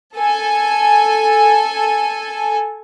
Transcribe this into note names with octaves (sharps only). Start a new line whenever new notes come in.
A4 G#5